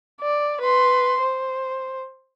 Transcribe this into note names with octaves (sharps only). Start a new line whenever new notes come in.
D5
B4 C6
C5